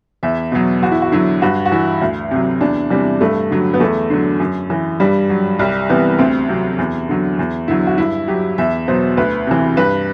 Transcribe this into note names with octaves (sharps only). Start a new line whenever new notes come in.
E2 E5
B2 F#3
E2 F#4
E4
F#4
D3 F#3 E4
G2 F#4
F#4
E3 E4
D2
C3 F#3
E2 D4
C3 E3 G3
G2 A3
D3 F#3
B3
E2 A3
D3 F#3
F#2
E3
G2 G3
F#3
C2 G3
C3 E3 B3
D2 C4
C3 F#3
E2
D3 F#3
E2
D3 F#3 E4
F#4
G2 E4
F#3 G4
E2 E5
B2 F#3 C5
D2 B4
C3 E3
G2 B4